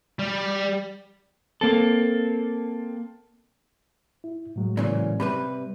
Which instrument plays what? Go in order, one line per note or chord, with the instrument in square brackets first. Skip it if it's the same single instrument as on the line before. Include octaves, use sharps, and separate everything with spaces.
[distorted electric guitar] G3
[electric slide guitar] A#3 C4 A4
[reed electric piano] E4
A2 F#3 G#3
[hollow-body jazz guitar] A#2 C#3 E3
[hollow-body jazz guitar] C3 G3 B4 [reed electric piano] B5